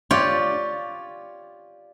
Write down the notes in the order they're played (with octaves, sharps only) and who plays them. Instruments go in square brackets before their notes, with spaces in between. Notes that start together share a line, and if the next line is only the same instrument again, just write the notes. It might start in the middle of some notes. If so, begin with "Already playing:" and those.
[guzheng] F4 G4 C#5 D5